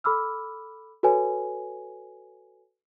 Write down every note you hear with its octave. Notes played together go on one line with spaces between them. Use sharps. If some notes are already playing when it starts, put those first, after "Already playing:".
A4 B5 D6 E6 F6
F#4 A4 B4 C#5 G#5